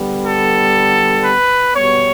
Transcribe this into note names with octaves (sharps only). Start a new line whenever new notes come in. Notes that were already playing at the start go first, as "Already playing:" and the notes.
Already playing: D3 G3 B3
A4
B4
B2 G3 B3 C#5